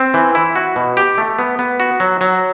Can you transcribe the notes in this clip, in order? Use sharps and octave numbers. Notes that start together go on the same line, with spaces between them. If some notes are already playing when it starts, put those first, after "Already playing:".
Already playing: C4
E3
E4
F#4
B2
G4
A3
B3
B3
F#4
F#3
F#3